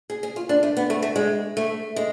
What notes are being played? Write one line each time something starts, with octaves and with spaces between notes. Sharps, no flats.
G#4
G#4
F4
D4
A3
B3
A3
A3
G#3
A3
G#3